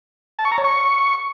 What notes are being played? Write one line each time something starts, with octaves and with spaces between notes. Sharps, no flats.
A5
C#6
A#5
C#5
C#6